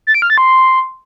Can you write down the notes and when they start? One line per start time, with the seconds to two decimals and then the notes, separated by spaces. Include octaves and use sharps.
0.07 A6
0.14 D7
0.22 F6
0.30 A6
0.38 C6